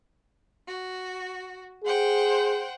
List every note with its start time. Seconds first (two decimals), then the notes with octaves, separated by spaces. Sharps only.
0.68 F#4
1.84 G#4 C5 F#5 G5